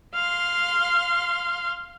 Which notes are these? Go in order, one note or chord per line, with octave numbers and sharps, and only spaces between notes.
F5 C6